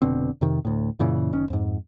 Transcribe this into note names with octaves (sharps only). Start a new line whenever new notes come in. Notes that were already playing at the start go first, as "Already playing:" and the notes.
F1 B2 D3 C4
F2 C3 D#3
D2 A2
F#2 A#2 C#3 E3
F#1 D#3 C#4
F2 G#2